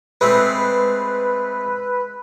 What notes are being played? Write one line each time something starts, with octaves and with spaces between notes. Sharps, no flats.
G#3 A3 C4 B4